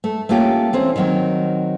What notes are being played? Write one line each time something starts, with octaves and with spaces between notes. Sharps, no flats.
A3
A3 A#3 C#4 F4 G4
E3 C4 C#4
D#3 F#3 C4